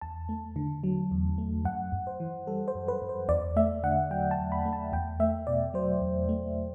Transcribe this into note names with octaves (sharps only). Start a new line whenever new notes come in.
E2 A5
A3
D3
F#3
E2
A3
F#2 F#5
F#2
C5
E3
G3 A4
C5
F#2
B4
F#2
C5
E2 D5
A3 E5
D3 F#5
F#3 G5
A5
E2
B5
A3
A5
E2 G5
A3 E5
B2 D5
F#3 C5
E2
A3